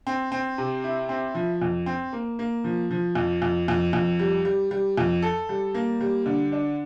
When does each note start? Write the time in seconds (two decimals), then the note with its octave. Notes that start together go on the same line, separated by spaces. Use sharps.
0.07 C4
0.32 C4
0.58 C3
0.84 E4
1.09 C4
1.35 F3
1.62 F2
1.86 C4
2.13 A#3
2.39 A#3
2.64 F3
2.91 F3
3.15 F2
3.42 F2
3.68 F2
3.93 F2
4.19 G3
4.45 G3
4.71 G3
4.98 F2
5.22 A4
5.49 G3
5.74 A#3
6.01 G3
6.26 D3
6.52 D4